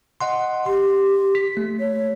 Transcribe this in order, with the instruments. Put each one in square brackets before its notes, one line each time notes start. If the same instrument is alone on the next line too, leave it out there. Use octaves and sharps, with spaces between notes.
[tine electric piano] D#5 F#5 C6
[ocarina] G4 [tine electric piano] C6
[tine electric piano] B6
A3
[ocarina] C#5